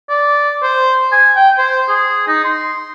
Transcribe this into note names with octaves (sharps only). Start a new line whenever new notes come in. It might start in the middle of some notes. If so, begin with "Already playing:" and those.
D5
C5
G#5
G5
C5
G#4
D#4
C6